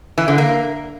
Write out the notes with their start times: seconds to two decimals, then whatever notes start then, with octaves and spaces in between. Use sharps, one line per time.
0.18 E3
0.28 D3
0.38 A#3